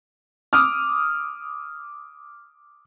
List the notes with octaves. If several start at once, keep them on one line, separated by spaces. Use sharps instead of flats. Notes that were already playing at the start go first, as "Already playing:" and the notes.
D6 D#6 F6